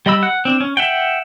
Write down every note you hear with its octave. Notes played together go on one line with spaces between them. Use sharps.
G3 D#5 B5 E6
F#5
C4 D4
C#4
E5 F#5 G5